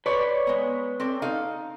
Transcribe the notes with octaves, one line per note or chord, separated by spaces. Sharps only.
B4 C#5 D5
G#3 B3
C4 A4 D5
D#4 A4 F5